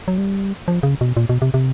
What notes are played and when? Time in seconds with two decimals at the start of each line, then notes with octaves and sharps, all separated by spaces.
0.08 F#3
0.18 G3
0.68 F3
0.83 C#3
1.01 B2
1.17 A#2
1.29 B2
1.42 C3
1.54 C3